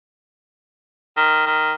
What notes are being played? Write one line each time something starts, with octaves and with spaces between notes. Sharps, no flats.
D#3
D#3